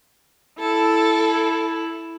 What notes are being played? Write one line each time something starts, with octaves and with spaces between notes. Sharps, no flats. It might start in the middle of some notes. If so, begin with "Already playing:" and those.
E4 A4